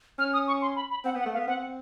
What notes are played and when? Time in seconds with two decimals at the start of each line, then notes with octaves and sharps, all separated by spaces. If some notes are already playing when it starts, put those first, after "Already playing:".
0.19 C#4 F6
0.33 D#6
0.47 C#6
0.62 C6
0.76 B5
0.91 B5
1.05 C4 F#5
1.15 B3
1.19 F#5
1.26 A3
1.33 F5
1.36 B3
1.47 C4 F#5